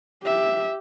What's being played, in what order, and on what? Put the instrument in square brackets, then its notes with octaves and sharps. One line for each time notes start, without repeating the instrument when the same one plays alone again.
[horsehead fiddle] G4 E5